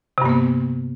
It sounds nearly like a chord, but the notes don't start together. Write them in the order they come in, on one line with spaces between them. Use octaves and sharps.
C3 G2 A#3 B3